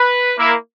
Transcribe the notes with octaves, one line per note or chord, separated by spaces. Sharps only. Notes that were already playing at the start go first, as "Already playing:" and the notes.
Already playing: B4
A#3 E4